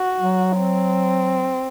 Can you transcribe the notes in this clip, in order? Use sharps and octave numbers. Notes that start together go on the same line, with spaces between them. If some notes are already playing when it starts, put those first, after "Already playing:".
Already playing: F#4
F#3
C4